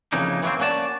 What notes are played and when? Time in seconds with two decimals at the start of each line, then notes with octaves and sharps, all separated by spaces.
0.13 F2 C#3 E3 A#3 D#4
0.43 E3 F#3 G#3 A#3 C4
0.60 A#3 C#4 F#4 D5 A5